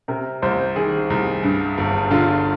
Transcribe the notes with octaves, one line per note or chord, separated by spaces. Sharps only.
C3 A#4
C2 C5
D#3 G#4
C2
G2
G1
D3 F4